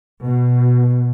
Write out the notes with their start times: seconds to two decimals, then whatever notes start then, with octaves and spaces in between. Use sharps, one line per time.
0.23 B2